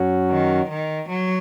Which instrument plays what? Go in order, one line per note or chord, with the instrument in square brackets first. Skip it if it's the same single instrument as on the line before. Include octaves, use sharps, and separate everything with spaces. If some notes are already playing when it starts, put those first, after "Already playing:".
Already playing: [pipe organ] F#2 F#3 C#4 F#4
[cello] D#3
D#3
F#3